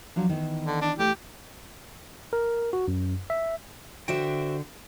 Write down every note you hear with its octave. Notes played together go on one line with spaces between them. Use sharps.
F3 F#3 D4
D#3 E3 B3
D3
D4
A3 G4
A#4
F#4
F#2
E5
D3 F#4 C5 E5 G5